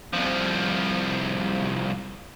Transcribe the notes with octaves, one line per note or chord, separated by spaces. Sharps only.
C2 F3